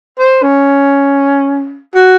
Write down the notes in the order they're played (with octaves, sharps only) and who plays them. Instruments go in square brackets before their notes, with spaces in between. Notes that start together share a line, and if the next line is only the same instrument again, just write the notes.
[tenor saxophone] C5
C#4
F#4